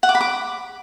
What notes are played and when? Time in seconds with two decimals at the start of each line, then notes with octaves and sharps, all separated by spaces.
0.03 F#5
0.09 D6
0.15 B5
0.21 D6